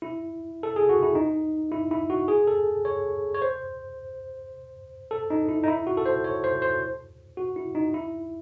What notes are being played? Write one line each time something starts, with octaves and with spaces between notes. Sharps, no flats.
E4
A4
G#4
F#4
E4
D#4
E4
E4
F#4
G#4
A4
C#5
C#5
C5
A4
D#4
E4
D#4
E4
F#4
A4
C5
C#5
C5
C5
F#4
E4
D#4
E4